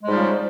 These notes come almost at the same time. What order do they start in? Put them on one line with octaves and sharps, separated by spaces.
G#3 G#2 G3 F3 C#3